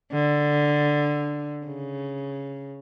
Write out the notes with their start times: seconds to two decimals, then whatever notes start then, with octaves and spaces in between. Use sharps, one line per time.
0.12 D3
1.66 C#3